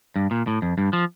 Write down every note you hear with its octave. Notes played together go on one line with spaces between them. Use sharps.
G2
A#2
A2
F2
G2
F3